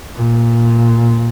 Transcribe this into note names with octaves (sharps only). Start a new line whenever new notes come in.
A#2